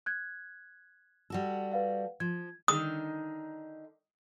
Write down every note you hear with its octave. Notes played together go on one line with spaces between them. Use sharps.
F#6 G#6
G3 F#4 A4
B4 F5 F#5
F3 G#6
D3 D#3 D#4 D#6